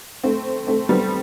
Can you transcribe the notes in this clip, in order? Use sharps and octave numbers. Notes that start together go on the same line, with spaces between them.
A3 C4
A3 C4
G3 B3